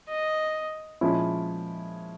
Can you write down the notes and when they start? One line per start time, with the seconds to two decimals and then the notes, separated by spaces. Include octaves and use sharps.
0.09 D#5
1.01 A#2 F3 G#3 C#4 E4